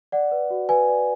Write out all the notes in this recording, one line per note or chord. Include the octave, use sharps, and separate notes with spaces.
D5 F#5
B4
F#4
B4 G#5
D5